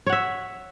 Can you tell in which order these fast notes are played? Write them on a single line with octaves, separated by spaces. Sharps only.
C#5 F#5 E5